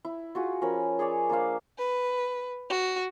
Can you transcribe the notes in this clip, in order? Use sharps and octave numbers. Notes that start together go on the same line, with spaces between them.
E4
F4 F#4 G#4 D#6
F3 C#4 A#4 B5
G#4 C#5 D5 G#5
A#3 D4 C5 F5
B4
F#4